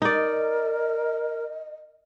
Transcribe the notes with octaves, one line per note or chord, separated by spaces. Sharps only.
D#4 A#4 D5 D#5